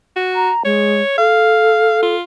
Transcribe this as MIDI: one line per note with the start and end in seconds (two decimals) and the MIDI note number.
0.16 0.50 66
0.35 0.63 82
0.65 1.02 56
0.65 1.17 73
1.18 2.14 69
1.18 2.01 77
2.03 2.22 65